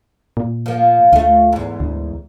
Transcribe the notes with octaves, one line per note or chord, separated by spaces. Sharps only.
A#2
F3 A#3
D2 A3 F4
E2 G#2
D2